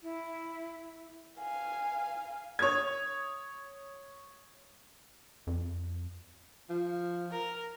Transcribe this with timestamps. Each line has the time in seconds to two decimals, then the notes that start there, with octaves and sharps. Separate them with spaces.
0.03 E4
1.39 F5 G#5
2.59 C#5 D#6 G#6
5.47 F2
6.69 F3
7.31 A#4